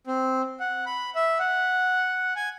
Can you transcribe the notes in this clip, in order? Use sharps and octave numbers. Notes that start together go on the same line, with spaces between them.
C4
F#5
B5
E5
F#5
G#5